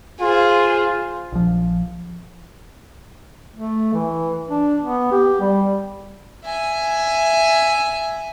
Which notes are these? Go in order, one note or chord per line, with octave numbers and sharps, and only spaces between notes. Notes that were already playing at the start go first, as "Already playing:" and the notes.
F4 G#4 C5
A#1 F3
A3
E3
D4
B3
G4
G3
E5 G#5